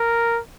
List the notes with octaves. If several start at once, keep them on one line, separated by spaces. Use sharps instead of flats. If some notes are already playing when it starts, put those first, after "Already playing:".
Already playing: A#4